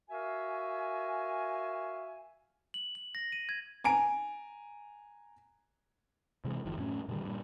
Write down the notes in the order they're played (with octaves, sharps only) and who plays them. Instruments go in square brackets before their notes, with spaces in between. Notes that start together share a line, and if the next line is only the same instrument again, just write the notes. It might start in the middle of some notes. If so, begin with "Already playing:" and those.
[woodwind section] F#4 A#4 E5 F5 G#5
[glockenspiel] F#7
F#7
A#6
D#7
G#6
[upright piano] G#5 A#5 D7
[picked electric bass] C3 E3 G#3
F#1 D#3 F3
F#2 A2 C#4
A#2 D3 D#3 G3
G2 A#2